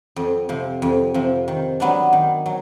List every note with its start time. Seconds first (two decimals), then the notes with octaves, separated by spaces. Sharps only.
0.16 F2
0.49 C3 F3
0.82 F2
1.14 C3 F3
1.48 D#3
1.80 F#3 B3 D4
2.13 D#3
2.46 F#3